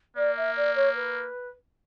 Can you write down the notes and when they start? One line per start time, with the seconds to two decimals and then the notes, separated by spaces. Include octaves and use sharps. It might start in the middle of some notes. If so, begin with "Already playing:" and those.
0.16 A#3 D5
0.36 E5
0.56 D5
0.75 C#5
0.94 B4